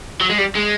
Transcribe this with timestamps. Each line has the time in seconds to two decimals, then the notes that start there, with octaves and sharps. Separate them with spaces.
0.21 F#3
0.30 G#3
0.38 G3
0.55 G#3